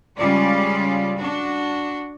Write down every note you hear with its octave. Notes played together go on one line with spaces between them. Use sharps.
C#3 G3 G#3 C#4 F4 D5
D4 F#4